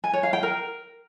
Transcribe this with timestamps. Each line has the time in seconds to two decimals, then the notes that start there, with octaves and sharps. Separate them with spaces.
0.04 G#5
0.13 C#5
0.23 F5
0.33 G5
0.43 A#4